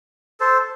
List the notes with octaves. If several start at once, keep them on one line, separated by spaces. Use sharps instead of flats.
A4 C5